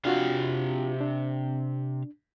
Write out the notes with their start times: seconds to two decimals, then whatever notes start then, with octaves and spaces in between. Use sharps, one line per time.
0.05 C3 D4 F4 F#4 F5
1.01 D4